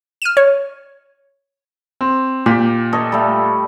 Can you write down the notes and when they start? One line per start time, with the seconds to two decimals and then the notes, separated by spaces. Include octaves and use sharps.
0.22 F6 D#7 E7
0.37 C#5
2.01 C4
2.46 A#2 G4
2.93 A4 C#5 D#5
3.12 G3 A3